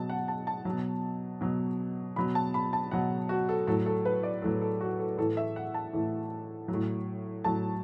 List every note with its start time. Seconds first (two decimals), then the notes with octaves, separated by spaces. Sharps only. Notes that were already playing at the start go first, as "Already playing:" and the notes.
Already playing: B2 F#3 A5
0.10 F#5
0.28 A5
0.47 A5
0.65 B2 F#3
1.41 B2 F#3
2.16 B2 F#3 B5
2.35 A5
2.54 B5
2.73 A5
2.91 B2 F#3 F#5
3.29 F#4
3.49 A4
3.67 A2 F#3 A4
3.86 A4
4.05 B4
4.23 D5
4.42 A2 F#3 A4
4.61 A4
4.81 F#4
4.99 A4
5.18 A2 E3 A4
5.37 E5
5.56 F#5
5.74 A5
5.93 A2 E3
6.68 F#3
6.74 A2
7.44 A2 F#3 A5